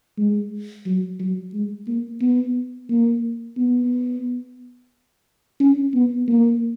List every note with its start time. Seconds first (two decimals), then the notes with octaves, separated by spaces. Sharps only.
0.18 G#3
0.86 F#3
1.19 F#3
1.54 G#3
1.88 A#3
2.21 B3
2.90 A#3
3.57 B3
5.60 C#4
5.94 B3
6.28 A#3